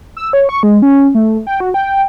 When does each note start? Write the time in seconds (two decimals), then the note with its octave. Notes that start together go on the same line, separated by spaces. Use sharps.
0.17 E6
0.33 C#5
0.49 C#6
0.63 G#3
0.82 C#4
1.15 A3
1.47 G5
1.60 F#4
1.74 G5